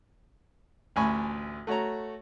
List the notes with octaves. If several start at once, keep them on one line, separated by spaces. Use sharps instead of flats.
A1 D2 G#5 B5 C#6
A3 F#4 C#5 A#5